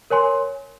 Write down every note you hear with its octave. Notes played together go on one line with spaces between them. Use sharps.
A#4 C#5 G#5 C6